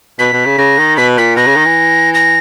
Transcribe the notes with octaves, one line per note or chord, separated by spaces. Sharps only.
B2 B6
B2
C#3
C#3 A#6
D#3
B2 B6
A#2 B6
B2 A#6
C#3
D#3
E3
A#6